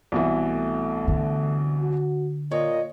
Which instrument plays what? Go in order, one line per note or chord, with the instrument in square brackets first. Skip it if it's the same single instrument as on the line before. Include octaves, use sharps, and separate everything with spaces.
[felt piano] C2 B2 E3
[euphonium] A3
[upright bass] D3
[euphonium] F#4
[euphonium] A#2 [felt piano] C#5 [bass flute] D#5